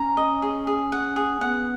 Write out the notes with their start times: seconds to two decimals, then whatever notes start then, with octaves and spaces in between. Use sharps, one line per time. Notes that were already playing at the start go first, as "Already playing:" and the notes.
Already playing: C#4 A#5
0.17 D#5
0.42 G#4
0.67 G#4
0.92 F#5
1.16 G#4
1.41 B3 F#5